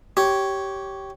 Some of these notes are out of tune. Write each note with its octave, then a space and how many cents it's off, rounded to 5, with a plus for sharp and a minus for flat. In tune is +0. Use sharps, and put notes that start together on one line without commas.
G4 -15 C#5 +0